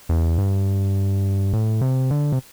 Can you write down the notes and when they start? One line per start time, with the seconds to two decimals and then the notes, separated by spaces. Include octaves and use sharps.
0.09 E2
0.38 G2
1.53 A2
1.81 C3
2.11 D3
2.32 C3